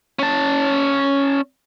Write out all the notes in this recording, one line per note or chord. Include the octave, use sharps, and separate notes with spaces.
C#4 A5